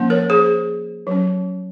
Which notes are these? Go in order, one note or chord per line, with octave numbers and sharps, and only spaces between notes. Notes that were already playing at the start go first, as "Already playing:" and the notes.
Already playing: F3 A#3 C#4
A#4 C#5
G#4 C5
F#3 C#4